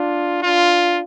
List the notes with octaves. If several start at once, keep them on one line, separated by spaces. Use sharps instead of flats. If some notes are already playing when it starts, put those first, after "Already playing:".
Already playing: D4 F4
D4 F4